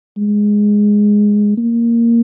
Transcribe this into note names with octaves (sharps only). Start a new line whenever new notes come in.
G#3
A#3